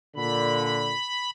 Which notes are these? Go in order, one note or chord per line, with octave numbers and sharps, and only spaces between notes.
A#2 D3 B5